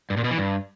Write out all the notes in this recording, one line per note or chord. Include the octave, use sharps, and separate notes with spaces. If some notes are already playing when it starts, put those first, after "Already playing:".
G2
A#2
B2
E3
G2